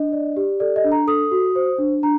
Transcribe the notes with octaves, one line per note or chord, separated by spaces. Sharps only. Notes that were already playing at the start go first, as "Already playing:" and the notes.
Already playing: D4 D#5
D5
G4
A4 D5
D#5
D4
A#5
A4 D#6
F#4
C5
D4
D4 A#5